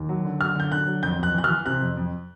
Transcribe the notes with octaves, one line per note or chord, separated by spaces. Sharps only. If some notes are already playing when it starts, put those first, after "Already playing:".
Already playing: D#2
F#3
D3
F#3 F6
D3 G6
D3 F#6
F#3
F2 G6
F2 F#6
E3 F#6
F6
E3
C3 F#6
F2
F2